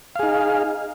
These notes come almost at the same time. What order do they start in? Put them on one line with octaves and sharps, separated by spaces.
F5 G#4 D#4